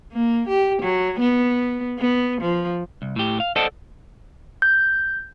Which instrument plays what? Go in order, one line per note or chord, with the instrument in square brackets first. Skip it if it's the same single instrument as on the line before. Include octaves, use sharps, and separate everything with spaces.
[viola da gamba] A#3
G4
F#3
B3
B3
F3
[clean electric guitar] C2
A2 G4
F5
A4 C5 D5 D#5 F#5 A5
[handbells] G6